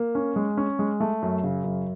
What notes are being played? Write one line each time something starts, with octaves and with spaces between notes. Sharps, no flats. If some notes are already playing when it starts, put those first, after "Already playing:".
Already playing: A#3
C#4
G#3
C#4
G#3
A3
F#2
C#3
F#2